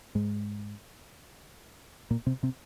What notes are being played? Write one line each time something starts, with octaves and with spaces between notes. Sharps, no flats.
G#2 G#3
A#2 A#3
C3 C4
C3 C4